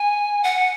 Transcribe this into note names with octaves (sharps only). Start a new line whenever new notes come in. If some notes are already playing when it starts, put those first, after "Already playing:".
Already playing: G#5
F#5